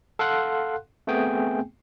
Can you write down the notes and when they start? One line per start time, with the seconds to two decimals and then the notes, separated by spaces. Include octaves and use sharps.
0.19 A4 F5 F#5 C6 F#6
1.07 A3 B3 C4 G#4 G5 G#5